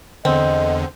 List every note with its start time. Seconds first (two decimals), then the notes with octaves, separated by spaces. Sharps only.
0.25 E2 D3 C4 D#5